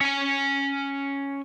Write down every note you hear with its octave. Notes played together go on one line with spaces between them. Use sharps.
C#4 G#5